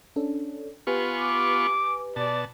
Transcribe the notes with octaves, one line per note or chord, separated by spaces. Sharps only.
C#4 D4 A4
B3 F4 G4 B4 G#5 C#6
D6
B2 D5 A5